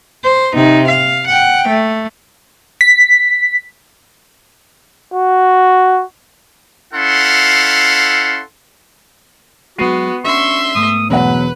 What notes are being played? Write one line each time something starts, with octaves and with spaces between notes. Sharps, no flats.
C5
C3 D#4
F5
F#5 G5
A3
B6
F#4
C#4 E4 A4 F5 F#5 C6
F#3 G#3 B3 F#4 C7 D#7
C#4 D4 F#4 E5 C6 C#6
G#2 A3 B3 D#6
E1 B2 F#3 B4 F#5